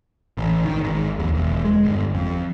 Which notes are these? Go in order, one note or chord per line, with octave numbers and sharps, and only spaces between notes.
A1
D#3
G#1
D#2
E1
G#3
G1
F2